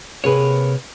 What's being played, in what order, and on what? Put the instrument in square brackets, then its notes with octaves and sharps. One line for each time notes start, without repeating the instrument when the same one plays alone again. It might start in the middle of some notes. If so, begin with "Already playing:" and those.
[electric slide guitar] C3 C#5 [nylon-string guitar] A#3 G#4 B4